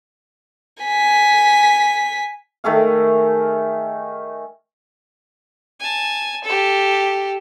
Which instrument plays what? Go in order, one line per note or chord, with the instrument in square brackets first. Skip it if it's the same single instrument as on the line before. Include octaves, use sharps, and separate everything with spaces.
[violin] G#5 B6
[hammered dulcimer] D#3 A3 G#4 F5
[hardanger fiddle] G#5 A5
G4 A4